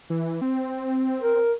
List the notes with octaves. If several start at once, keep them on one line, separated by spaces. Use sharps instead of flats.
E3
C4
A#4